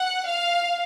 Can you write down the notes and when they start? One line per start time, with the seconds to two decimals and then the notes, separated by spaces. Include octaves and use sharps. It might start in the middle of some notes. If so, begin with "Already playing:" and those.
Already playing: F#5
0.26 F5